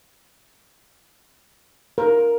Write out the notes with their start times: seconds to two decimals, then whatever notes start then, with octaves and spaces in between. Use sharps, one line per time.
1.98 A#4